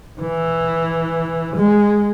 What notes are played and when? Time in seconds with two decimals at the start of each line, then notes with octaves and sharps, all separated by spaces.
0.21 E3
1.56 G#3